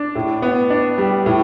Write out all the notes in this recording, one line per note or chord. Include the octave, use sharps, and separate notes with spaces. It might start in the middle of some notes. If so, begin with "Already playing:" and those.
Already playing: D4
A2
B3
D4
G3
A2